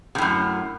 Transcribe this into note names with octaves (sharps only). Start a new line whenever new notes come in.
F#2 A2 C3